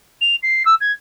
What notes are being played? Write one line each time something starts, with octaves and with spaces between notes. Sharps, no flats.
F7
C7
E6
G#6